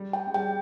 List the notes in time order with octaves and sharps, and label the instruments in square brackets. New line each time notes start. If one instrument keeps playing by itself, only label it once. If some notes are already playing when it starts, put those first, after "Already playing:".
Already playing: [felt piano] G3
[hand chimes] G5
[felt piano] G#3
[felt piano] G3 [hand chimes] G5